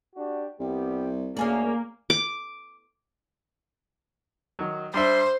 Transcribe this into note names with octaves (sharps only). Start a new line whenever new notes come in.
D4 F#4 G4
C2 G3 B3 G4
D2 A#3 C#4 G#4 D5
D6
D#3 F#3
G3 D4 C5 E5 C6